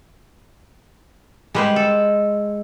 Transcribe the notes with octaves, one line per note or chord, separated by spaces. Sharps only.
G3 G#3 B4 C5 D#5 G#5
A4